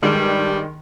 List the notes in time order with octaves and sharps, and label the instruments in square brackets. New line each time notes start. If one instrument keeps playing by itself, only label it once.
[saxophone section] G2 G3 [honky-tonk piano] D#3 G#3